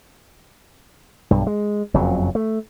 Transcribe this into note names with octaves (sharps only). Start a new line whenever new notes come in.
B1 G2
G#3
F#1 F2 C#3 F#3
A3